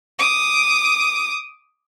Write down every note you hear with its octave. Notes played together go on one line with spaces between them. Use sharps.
D6 D#6